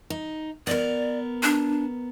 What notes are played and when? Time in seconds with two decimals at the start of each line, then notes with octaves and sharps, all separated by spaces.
0.10 D#4
0.67 B3 A#4 D5
1.43 D4